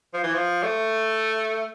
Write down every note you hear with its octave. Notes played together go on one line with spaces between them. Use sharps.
F3
E3
F3
A3